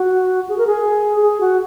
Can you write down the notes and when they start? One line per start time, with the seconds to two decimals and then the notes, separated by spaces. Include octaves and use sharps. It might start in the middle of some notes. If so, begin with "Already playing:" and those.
Already playing: F#4
0.49 G#4
0.58 A#4
0.67 G#4
1.22 G#4
1.41 F#4